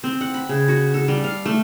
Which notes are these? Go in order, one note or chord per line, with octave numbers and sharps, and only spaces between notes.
C4
F#5
B5
C#3
F#4
A4
G3
F5
A3